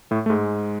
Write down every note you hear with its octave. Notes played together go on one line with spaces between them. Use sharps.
A2 A3
A3
G#2 G#3